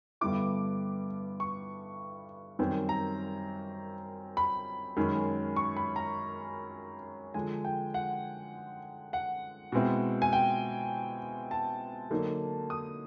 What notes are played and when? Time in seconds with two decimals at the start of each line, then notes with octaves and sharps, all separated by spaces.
0.21 G2 D3 G3 B3 E4 D6
1.40 C#6
2.59 F#2 D#3 G3 C4
2.89 A#5
4.37 B5
4.96 F#2 D#3 G#3 C#4
5.56 C#6
5.77 B5
5.96 A#5
7.34 D3 F3 G#3 G#5
7.65 G5
7.94 F#5
9.13 F#5
9.72 B2 G#3 C4 E4
10.22 G#5
10.33 G5
11.51 A5
12.10 D3 F#3 A#3 D#4
12.70 D#6